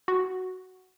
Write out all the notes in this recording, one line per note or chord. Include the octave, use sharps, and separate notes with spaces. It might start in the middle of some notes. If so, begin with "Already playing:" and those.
F#4